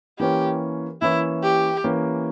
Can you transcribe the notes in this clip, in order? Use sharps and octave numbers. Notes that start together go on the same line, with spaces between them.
E3 A#3 C#4 G4
E3 A#3 C#4 E4
G4
E3 A#3 C#4